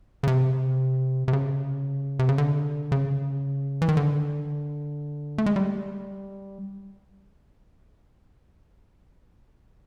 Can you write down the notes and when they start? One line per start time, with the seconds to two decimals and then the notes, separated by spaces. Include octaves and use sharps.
0.23 C#3
0.28 C3
1.28 C3
1.33 C#3
2.19 C3
2.29 C#3
2.38 D3
2.92 C#3
3.82 E3
3.89 D#3
3.97 D3
5.38 A3
5.46 G#3
5.56 G3